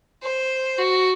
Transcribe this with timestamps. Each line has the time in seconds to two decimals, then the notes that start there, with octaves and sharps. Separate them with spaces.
0.22 C5
0.78 F#4